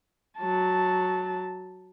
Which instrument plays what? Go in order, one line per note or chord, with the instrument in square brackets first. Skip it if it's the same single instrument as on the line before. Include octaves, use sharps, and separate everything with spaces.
[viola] F#3 A5